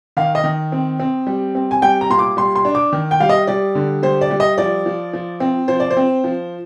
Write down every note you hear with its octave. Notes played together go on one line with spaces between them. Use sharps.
D#3 F5
D#5
D#3
C4
C4
G3
C4
G#5
G3 G5
A#5
A#2 C6
D6
G3 C6
C6
D4
D6
D#3
G5
G3 F5
D#5
G3 D5
D3
G3 C5
D5
G3
D#5
F3 D5
F3
F3
C4
F3 C5
D5
C5
C4
F3